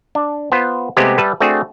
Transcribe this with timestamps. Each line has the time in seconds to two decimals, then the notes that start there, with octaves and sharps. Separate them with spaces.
0.15 D4
0.52 B3 F4 C5
0.97 C3 G#3 A3 B3 C4 G4
1.18 G3 B4 E5 A5
1.40 A3 C4 D4 F#4 G#4